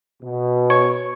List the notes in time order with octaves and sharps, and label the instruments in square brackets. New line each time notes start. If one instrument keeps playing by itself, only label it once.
[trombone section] B2
[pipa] C#5